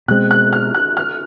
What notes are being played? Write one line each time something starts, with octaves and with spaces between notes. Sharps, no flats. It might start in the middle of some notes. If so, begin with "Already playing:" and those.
B2 G#3 C4 F#6
F#6
F6
F#6
F6